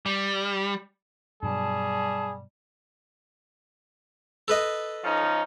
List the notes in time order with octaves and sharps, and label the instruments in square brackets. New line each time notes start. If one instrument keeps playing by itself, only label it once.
[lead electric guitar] G3
[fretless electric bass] G2 B2 F#3 [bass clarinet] G3 [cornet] G#4 [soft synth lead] A5
[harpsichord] A4 B4 D#5
[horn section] F3 C#4 D#4